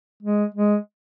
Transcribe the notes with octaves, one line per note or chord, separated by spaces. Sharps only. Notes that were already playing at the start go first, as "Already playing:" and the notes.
G#3
G#3